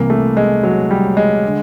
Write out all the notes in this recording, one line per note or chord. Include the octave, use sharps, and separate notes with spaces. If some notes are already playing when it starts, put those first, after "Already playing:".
Already playing: C2 C3 E3 A#3
A3
G#3
F#3
G3
G#3
D3